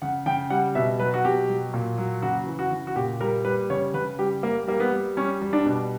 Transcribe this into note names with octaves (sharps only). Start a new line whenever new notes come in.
C#3 F#5
C#3 G5
G3 F#5
B2 E5
F#3 B4
F#4
B2 G4
F#3
A#2
F#3
C#3 F#4
E3
F#4
C#3
F#4
A#2 G4
G3 A#4
G3 B4
C#3 C#5
C#3 B4
G3 G4
G3 A#3
G3 A#3
B3
G3
G3 C#4
G3
D4
B2